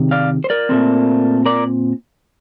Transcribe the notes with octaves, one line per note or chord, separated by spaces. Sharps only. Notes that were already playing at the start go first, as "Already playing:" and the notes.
Already playing: C3 D#3
D5 F5
C5
A#4 D5
A#2 F3 A3 C4
A#4 D5